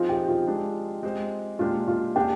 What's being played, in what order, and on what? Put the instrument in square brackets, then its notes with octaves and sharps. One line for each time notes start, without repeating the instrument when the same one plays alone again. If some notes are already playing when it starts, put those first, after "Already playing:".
Already playing: [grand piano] F3 C4 D#4 G#4 C5 [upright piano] F4
[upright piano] G4
F4
[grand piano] G#3 D4 G#4
G#3 C4 G4 C5
[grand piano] A#2 G#3 D4 G4 [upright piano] F4
[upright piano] F4
[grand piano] A#3 D4 G#4 [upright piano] G4